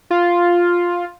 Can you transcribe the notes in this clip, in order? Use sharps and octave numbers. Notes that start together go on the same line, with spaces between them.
F4